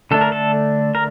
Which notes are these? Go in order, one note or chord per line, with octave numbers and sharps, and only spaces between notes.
D3 A3 D4 A4
A#4
A4
A#4